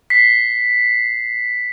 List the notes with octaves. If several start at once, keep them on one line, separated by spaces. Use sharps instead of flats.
B6 C7